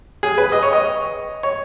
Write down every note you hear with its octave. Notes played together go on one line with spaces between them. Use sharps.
G#4
B4
D#5
C#5
D#5
C#5